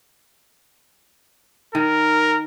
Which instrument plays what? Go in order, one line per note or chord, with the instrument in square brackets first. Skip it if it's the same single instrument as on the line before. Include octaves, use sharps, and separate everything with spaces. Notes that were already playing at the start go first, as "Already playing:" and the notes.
[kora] D#3 [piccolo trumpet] A#4